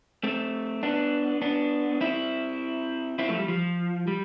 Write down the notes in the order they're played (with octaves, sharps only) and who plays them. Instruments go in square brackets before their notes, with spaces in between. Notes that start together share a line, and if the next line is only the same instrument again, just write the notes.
[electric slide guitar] A3 C4
B3 D4
B3 D4
C4 E4
C4 E4
F3 A3
G3
F3
G3